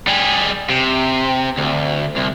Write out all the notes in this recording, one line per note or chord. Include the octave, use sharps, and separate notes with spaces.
G3 G#4
C3
D2
C2